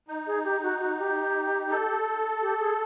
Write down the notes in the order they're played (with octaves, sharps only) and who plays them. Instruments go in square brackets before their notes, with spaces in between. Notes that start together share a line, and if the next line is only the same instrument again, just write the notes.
[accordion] D#4
[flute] G#4
G4
F#4
F#4
G4
[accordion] A4
[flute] G4
G#4